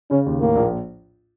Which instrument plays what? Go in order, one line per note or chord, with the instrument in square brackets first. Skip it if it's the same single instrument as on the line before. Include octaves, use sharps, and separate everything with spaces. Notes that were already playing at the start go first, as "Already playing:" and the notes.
[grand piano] C#3 [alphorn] C#4
[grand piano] D#2
[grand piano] A2 [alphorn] A#3
[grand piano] A#1